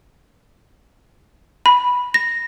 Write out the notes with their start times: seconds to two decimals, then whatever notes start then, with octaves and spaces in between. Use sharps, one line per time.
1.66 B5
2.14 A#6